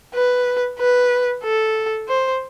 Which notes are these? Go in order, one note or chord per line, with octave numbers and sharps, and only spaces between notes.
B4
B4
A4
C5